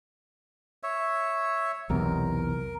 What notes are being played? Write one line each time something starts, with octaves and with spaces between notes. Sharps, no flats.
C#5 E5
B1 E2 C3 A#4